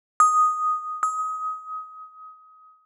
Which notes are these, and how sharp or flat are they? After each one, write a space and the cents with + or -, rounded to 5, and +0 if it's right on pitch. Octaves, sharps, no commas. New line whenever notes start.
D#6 +0
D#6 +25